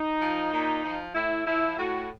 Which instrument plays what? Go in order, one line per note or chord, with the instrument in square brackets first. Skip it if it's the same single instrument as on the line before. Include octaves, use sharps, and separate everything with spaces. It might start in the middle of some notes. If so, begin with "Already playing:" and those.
Already playing: [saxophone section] D#4
F3
A#2
F3
A2 E4
F3 E4
A2 F#4